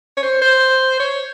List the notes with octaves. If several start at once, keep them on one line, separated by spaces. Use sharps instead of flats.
C#5
C5
C5
C#5